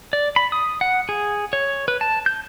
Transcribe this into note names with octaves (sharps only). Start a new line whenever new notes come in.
D5
B5
D#6
F#5
G#4
C#5
B4
A5
G6